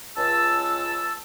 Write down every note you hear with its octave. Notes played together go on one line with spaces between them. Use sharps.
C#2 A5 E6